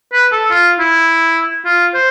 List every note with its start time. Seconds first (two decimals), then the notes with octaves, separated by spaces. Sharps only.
0.13 B4
0.32 A4
0.51 F4
0.79 E4
1.65 F4
1.94 C5